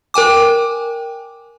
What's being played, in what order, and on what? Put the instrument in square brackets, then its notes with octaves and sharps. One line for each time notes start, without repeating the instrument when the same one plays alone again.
[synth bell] A#4 G5 G#5 D6